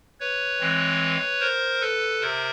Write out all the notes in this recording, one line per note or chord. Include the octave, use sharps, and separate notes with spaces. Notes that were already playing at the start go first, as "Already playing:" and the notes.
B4 C#5
E3 G#3 C4
A#4 C5
A4 B4
C3 A#4 C5